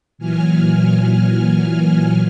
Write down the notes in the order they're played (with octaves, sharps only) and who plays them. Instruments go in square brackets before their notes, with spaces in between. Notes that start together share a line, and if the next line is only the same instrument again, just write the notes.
[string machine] A#2 E3 F#3 G#5 F6